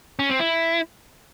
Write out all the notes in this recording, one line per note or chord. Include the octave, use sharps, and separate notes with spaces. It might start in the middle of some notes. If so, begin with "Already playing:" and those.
C#4
C4
E4